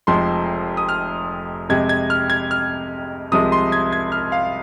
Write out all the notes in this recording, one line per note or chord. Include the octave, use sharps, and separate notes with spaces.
F1 F2 F3 G#3 C6
D#6
F6
F2 C3 G#3 G#6
G#6
F6
G#6
F6
C2 C3 F3 G#3 D#6
C6
G#6
G#6
F6
F5